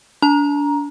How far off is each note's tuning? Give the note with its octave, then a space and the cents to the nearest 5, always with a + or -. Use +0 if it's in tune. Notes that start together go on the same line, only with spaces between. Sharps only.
D4 -30 A#5 +10